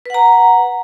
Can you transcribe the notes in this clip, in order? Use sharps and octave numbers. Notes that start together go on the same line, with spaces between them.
B4 F#5 A#5